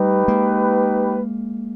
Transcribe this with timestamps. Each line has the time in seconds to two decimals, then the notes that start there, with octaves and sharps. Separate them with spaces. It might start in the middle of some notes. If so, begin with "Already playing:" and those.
Already playing: G3 A3 D#4 G4 B4
0.28 G#3 A#3